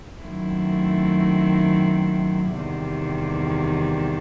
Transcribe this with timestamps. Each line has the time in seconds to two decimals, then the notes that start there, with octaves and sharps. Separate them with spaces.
0.22 F#2 D#3 A3 C4 E4
2.53 E2 C3 D#3 G3